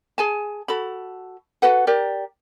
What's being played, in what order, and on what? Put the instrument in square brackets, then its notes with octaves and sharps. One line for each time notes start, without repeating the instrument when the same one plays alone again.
[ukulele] G#4 G#5 A5
F#4 A4 B5
F#4 A4 B4 F#5
G4 A#4 D5